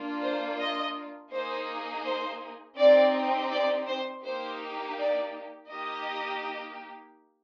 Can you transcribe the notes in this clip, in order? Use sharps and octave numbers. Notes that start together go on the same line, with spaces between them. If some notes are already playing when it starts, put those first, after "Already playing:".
Already playing: A#3 D4 F4
C5
D#5
A#3 D#4 G#4 C5
C5
C4 D#4 G4 D5
D5
C5
A#3 D#4 G4 C5
D5
A#3 D#4 G4 D#5